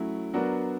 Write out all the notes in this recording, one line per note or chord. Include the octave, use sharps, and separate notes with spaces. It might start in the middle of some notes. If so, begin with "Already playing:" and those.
Already playing: F#3 A3 C#4 E4
F#3 B3 D4 F#4 A#4